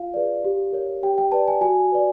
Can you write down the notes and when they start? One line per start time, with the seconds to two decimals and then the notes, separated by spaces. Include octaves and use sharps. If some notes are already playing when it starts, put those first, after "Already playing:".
Already playing: F4 F5
0.14 G#4 B4 D5
0.44 G4
0.73 A#4 C#5
1.03 G4 G5
1.18 G5
1.32 B4 D5 A5
1.48 G#5
1.61 F#4 G#5
1.92 B4 D5